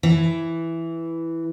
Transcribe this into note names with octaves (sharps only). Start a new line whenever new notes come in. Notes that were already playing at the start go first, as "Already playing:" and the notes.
E3